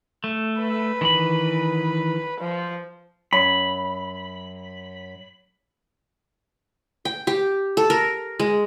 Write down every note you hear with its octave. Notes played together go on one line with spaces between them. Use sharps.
A3
B4
D#3 E3 B5
F3
F#2 B5
G5
G4
A4
A#4
G#3